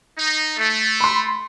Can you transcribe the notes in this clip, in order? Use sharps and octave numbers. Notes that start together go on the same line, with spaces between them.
D#4
A3
B5 C6